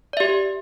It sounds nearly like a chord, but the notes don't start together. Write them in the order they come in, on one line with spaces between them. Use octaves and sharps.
D5 E5 G4